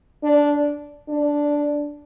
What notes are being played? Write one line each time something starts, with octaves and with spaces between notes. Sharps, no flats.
D4
D4